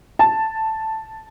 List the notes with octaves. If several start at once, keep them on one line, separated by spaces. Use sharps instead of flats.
A5